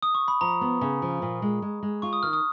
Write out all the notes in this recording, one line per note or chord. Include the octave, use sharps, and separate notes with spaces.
D#6
C#6
B5
F3 A#5
B3
C#3
F3
A#2
G#3
G#3
G#3
F4 C#6
D#6
D#3 F6
D#6